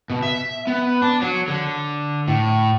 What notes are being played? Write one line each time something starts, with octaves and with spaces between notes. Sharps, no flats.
B2
E5
B3
D4
F#3
D3
A2